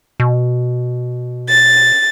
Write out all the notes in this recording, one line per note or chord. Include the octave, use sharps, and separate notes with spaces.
B2
A6